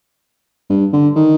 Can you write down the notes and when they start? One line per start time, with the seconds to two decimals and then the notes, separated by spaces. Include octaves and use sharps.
0.70 G2
0.93 D3
1.16 D#3